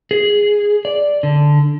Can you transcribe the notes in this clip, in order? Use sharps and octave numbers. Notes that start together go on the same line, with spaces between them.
G#4
D5
D3